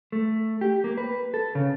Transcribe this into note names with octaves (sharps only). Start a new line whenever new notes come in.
A3
G4
A#3
B4
A4
C#3